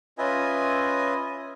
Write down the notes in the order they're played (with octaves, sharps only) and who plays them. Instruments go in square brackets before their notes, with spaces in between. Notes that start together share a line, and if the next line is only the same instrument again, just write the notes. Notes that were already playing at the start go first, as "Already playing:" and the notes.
[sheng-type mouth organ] C#4 F4 B4 D#5 E5 G#5